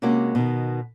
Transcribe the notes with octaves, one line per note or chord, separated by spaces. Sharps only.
C3 G#3 A#3 C#4 F#4
B2 D#3